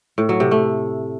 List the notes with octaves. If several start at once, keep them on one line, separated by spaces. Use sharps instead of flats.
A2
F#3
C3
A3